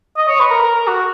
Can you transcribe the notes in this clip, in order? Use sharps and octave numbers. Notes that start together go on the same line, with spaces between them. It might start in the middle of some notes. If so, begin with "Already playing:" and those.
D#5
C#5
B4
A#4
A#4
A#4
F#4